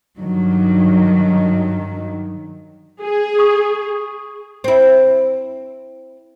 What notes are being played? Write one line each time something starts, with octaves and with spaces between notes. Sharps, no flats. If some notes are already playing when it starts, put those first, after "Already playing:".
G2 D#3 F#3
G#4
C#6 D#6
C4 E4